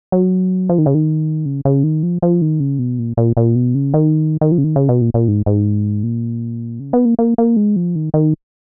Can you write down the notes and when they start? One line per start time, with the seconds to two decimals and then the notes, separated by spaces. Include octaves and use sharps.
0.12 F#3
0.69 F3
0.78 D#3
0.86 C#3
0.94 D#3
1.46 C#3
1.65 C#3
1.83 D#3
2.03 F3
2.22 F3
2.42 D#3
2.60 C#3
2.79 B2
2.99 A#2
3.17 A#2
3.37 A#2
3.55 B2
3.75 C#3
3.94 D#3
4.41 D#3
4.52 F3
4.58 C#3
4.64 D#3
4.76 C#3
4.89 B2
5.01 A#2
5.14 A#2
5.28 G#2
5.46 G#2
6.03 A#2
6.80 C#3
6.93 B3
7.05 A#3
7.19 A#3
7.38 A#3
7.56 G#3
7.76 F3
7.95 D#3
8.14 D#3